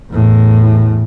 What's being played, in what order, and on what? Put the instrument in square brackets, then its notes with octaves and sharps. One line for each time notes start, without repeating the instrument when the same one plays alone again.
[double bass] E2 A2